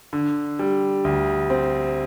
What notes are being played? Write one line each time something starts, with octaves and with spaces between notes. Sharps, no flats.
D3
G3
D2
C4